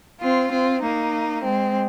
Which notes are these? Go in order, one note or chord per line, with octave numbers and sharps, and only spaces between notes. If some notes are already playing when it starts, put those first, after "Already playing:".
C4 F4
C4 F4
A#3 D#4
G#3 C4